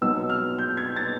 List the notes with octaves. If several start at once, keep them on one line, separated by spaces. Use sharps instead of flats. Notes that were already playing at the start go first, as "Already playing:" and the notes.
B2 F#3 B3 D#4 E6
F6
G6
G#6
A6